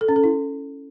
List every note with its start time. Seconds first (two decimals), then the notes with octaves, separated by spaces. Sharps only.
0.01 A4
0.08 C#4
0.16 A4
0.24 E4